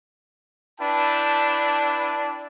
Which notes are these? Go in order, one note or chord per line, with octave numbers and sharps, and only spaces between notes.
D4 E4 B4 G5 A5